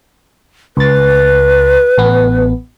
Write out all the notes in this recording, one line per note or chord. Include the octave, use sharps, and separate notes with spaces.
C#2 B4 A6
A1 B3